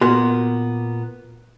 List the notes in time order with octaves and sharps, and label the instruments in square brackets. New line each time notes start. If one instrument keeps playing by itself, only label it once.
[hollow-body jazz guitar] A#2 A#3 B3 [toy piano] F#4